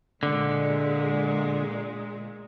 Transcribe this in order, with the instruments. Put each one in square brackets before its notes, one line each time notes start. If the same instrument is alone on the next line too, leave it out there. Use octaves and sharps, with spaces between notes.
[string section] A#2 G#3 [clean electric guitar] D3